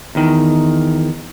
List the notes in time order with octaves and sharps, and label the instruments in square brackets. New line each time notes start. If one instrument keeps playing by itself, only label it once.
[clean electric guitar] E2 D#3